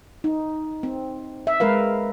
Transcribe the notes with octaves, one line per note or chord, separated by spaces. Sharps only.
D#4
C4
E5
G#3 A#4 B4 F5